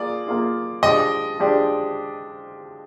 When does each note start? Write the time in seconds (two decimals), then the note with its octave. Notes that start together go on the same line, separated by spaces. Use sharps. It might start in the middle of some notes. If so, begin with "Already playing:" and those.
Already playing: A#3 F4 G#4 D5
0.27 A#3 F4 G#4
0.83 F3 G#3 D4 G4 D5 D#5
1.39 F3 G#3 D4 G4 D5